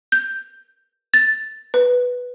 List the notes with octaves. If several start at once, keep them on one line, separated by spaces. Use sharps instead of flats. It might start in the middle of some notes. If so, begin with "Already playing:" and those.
G6
A6
B4